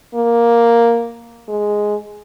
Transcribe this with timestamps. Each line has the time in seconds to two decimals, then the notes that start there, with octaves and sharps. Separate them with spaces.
0.15 A#3
1.49 G#3